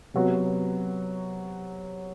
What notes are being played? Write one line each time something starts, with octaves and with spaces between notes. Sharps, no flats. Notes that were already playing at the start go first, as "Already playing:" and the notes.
C3 F#3 B3 F#4